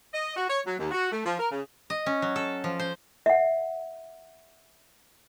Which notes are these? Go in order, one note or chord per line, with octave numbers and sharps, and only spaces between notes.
D#5
F#4
C#5
F#3
D#2
F#4
A3
F3
A#4
C#3
D#5
C#4
F#3
A4
F3
C5
E5 F#5